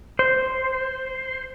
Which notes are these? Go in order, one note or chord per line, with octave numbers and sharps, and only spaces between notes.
C5